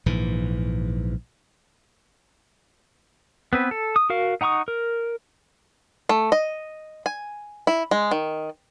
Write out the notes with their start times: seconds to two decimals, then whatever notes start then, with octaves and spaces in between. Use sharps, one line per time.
0.06 A#1 G#2 E3
3.53 B3 C4 B4
3.71 A4
3.96 D#6
4.10 F#4 A#4 F5
4.41 D#4 F#5 A#5 C#6 D#6
4.68 A#4
6.09 A3
6.32 D#5
7.06 G#5
7.67 E4
7.91 G#3
8.11 D#3